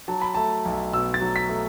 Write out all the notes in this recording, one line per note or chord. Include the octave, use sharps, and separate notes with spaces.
F#3 A5
B5
A3 A5
B1
B2 E6
A6
F#3
B6
A3